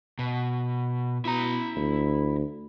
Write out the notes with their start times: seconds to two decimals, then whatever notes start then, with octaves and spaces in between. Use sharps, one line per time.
0.19 B2
1.25 B2 E4 A#5
1.76 D2